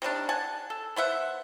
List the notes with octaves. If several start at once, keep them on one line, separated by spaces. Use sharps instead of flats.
C3 D#3 G3 D4
F#5 G#5 A5
A4
B3 C5 E5 F#5